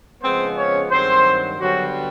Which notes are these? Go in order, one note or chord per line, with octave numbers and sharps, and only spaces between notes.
C#3 F3 G#3 B3 C4 C5
C#4 C#5
G2 D#3 F#3 C4 C5
D3 F#3 G3 B3 F#4